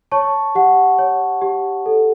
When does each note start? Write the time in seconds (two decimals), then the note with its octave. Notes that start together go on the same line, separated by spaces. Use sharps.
0.12 C#5 A5 C#6
0.55 G4 F#5
0.99 C#5
1.42 G4
1.86 A4